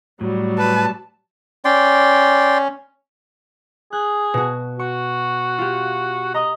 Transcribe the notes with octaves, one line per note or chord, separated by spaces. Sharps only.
A2 F#3 G3
B4 A5
C#4 D5 G5 C6
G#4 F#6
B2 F#4
F#4 C#6
F4 G4
D#5 A#5 D#6